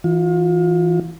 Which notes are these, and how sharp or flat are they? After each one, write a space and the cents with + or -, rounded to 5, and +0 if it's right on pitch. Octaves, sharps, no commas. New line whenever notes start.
E3 +0 F4 +35